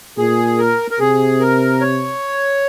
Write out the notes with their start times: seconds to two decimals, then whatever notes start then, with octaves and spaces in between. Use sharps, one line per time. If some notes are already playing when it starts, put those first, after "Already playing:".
0.17 A#2 G#4
0.58 A#4
0.91 A#4
1.00 C3 G#4
1.40 A#4
1.81 C#5